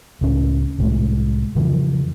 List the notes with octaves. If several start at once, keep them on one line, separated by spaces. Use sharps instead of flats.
C#2 A2 C#4
C2 A2 G#3 A3
F2 C#3 E3 F3